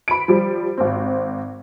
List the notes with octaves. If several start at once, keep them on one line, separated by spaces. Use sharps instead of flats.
B5 D7
F3 G3
G#1 C4